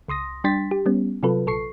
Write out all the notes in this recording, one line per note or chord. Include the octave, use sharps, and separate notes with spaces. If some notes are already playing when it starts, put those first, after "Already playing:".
C#2 C6 D#6 A#6
G3 D4 G5 C6 A6 B6
G4
G3 B3 C#4
C3 F#3 F4 A4 B4
A#1 A4 C#6 C7